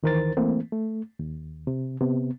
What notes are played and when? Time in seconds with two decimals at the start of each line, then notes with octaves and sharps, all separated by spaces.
0.03 D2 D#3 E3 A#4 C5 A6
0.37 E3 A3 A#3 C4
0.72 A3
1.19 D#2
1.67 C3
2.01 C3 B3